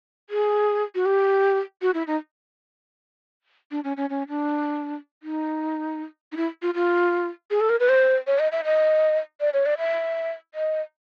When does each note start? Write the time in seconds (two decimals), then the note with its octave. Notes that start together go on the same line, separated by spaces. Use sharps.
0.30 G#4
0.95 F#4
1.06 G4
1.82 F#4
1.94 E4
2.07 D#4
3.71 D4
3.84 C#4
3.97 C#4
4.10 C#4
4.28 D4
5.23 D#4
6.32 D#4
6.37 E4
6.62 F4
6.74 F4
7.51 G#4
7.61 A4
7.69 A#4
7.80 B4
7.89 C5
8.27 C#5
8.39 D#5
8.52 E5
8.65 D#5
9.41 D5
9.53 C#5
9.66 D5
9.78 E5
10.54 D#5